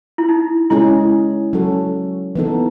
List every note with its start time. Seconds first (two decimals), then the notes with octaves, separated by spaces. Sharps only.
0.18 E4
0.29 D#4
0.70 G#3 C#4 E4 G#4
1.53 F#3 C#4 F#4 A4
2.35 E3 B3 D#4 A4